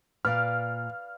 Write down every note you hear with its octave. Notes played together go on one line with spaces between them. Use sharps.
A#2 B4 D5 F5 F6